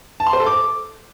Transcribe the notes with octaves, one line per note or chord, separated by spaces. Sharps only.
A5
C6
C5
A4
D6